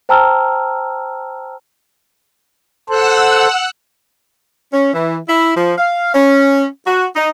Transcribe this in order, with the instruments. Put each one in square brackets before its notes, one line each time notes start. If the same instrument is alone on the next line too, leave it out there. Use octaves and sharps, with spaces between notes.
[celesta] C5 G5 A5 A#5 E6 F6
[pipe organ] A4 C5 [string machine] F#5 E6 F#6
[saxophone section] C#4
E3
E4
F3
F5
C#4
F#4
D#4